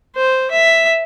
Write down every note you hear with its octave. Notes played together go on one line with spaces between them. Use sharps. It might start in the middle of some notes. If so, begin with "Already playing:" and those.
C5
E5